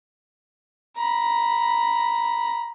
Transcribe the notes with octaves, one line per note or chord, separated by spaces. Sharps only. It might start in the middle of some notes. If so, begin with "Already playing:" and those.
A#5 B5